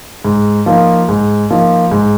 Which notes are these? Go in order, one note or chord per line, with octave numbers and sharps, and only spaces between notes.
G#2
F3 A#3 D#4
G#2
F3 A#3 D#4
G#2